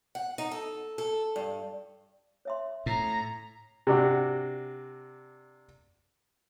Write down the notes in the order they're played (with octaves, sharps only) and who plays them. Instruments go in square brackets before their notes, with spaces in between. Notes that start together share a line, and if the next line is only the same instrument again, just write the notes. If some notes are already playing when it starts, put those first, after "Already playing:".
[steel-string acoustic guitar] F#5
D#4
A4
A4
G2
[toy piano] C#5 E5 C6
[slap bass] A2 [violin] A#5
[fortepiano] C3 D4 F#4